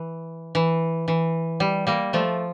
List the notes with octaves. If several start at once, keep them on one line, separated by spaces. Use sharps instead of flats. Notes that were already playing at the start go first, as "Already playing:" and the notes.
Already playing: E3
E3
E3
G3
G3 A#3
F3 A3